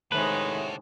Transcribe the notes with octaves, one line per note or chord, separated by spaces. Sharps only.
A2 C3 D#3 G#3 D4 F#4 B4